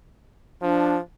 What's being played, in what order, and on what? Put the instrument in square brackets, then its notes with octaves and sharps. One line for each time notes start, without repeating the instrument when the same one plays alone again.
[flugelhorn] F3 [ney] D4